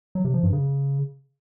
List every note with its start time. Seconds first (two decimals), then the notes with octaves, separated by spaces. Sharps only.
0.15 F#3
0.25 C3
0.34 F3
0.43 G2
0.53 C#3